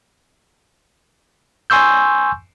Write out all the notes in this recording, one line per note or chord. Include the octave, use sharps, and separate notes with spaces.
G#5 C6 C#6 E6 G6